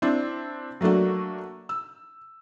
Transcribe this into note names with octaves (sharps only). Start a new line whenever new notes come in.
C4 D4 E4
F#3 A3 A#3 D4 F#4
E6